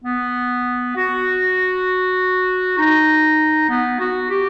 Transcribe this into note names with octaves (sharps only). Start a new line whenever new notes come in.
B3
F#4
D#4
B3
F#4
G4